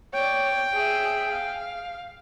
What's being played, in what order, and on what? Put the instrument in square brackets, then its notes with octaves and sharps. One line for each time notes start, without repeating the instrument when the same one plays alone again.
[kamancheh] C#5 D5 [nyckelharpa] G5
[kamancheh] G#4 E5
F5